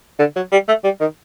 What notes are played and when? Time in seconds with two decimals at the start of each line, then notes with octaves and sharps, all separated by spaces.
0.19 D3
0.36 F#3
0.52 G3
0.68 A3
0.84 G3
1.01 D#3